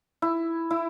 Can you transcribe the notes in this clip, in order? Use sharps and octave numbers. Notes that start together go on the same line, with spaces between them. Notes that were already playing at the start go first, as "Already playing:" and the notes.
E4
E4